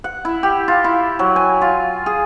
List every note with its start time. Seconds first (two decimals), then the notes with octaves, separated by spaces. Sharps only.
0.04 F#5
0.25 E4
0.43 G4
0.68 F4
0.84 E4
1.19 F#3
1.36 G#5
1.62 F4
2.06 G#4